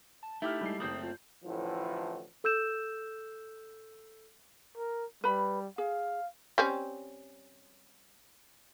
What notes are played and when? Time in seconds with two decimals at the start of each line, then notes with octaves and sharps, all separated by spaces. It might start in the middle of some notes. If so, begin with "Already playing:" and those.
0.23 A5
0.42 A3 D#4 E4 G4 F6
0.61 G3 G#3 C7
0.80 F#1 A3 C4 D#6 G6 F#7
1.03 F4
1.45 A1 A2 D3 E3 F3
2.44 A4 E6 G6 E7
4.77 A#4
5.24 G3 B4 B5
5.78 G#4 F5
6.58 G3 C4 C#4